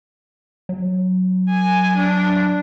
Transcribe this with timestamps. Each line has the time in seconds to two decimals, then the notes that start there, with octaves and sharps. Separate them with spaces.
0.69 F#3
1.50 G#5
1.97 D4